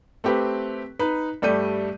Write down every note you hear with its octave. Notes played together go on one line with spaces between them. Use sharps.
A3 C4 G4 B4
D#4 B4
G2 G3 A3 G4 G6 D#7